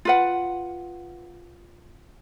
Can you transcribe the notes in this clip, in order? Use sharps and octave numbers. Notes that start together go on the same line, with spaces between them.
F4 B4 F#5